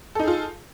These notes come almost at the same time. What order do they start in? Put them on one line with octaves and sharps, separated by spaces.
A4 D#4 G#4 F4